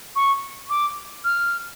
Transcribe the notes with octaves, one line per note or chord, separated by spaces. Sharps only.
C#6
D6
F6